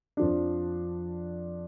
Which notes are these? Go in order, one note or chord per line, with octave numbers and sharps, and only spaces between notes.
F2 F3 D4